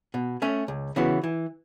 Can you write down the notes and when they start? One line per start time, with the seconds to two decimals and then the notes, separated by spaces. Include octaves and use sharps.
0.14 B2
0.42 A3 C#4
0.68 C#2
0.96 C#3 E3 B3 F#4
1.24 E3